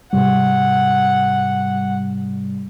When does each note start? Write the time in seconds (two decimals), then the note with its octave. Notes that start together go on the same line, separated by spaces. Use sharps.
0.13 G#2 C3 G3 F#5